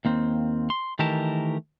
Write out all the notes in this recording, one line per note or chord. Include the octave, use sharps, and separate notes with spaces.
D#2 A#3 C4
C6
D#3 E3 A3 G4 A#4 A5